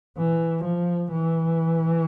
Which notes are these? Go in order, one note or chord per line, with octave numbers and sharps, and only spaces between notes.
E3
F3
E3